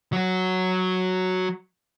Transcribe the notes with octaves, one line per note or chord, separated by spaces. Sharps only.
F#3 F#4